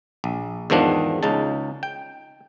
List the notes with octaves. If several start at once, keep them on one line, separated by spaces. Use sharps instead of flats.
A#1
E2 G#2 D#3 F3 D4 F#5
C#2 C#3 D#4 A5
G5